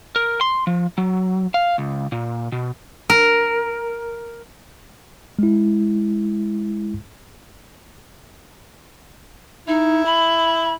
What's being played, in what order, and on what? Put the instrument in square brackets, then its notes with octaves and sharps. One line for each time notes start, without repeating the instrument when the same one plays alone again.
[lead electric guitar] A#4
C6
F3
F#3
F5
C#2
A#2
B2
[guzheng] A#4
[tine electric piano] G#3 E4
[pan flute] D#4 [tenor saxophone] E4
[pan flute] B5